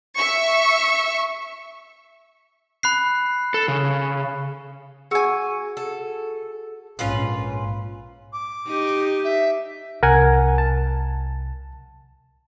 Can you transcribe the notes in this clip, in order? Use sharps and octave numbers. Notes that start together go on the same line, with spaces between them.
E5 C#6
B5 F#6 C7
A4
C#3
F#4 G#4 G#5 E6
A4
A#1 G#2 C#4 F4 B4
D6
D#4 G4
E5
C2 A#4 F#5 G#5
A5